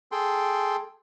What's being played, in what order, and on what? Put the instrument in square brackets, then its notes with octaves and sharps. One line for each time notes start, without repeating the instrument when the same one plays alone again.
[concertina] G#4 A4 G5 C6